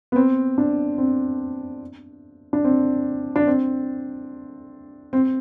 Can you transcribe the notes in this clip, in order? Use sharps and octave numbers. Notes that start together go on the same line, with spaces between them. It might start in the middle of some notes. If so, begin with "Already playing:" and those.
B3
C4
D4
C4
D4
C4
D4
C4
C4